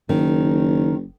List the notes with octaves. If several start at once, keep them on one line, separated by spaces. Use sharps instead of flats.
F#1 D#3